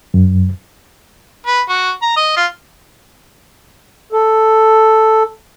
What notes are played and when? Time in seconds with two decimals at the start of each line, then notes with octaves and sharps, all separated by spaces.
0.14 F#2
1.47 B4
1.69 F#4
2.02 A#5
2.17 D#5
2.37 F4
4.12 A4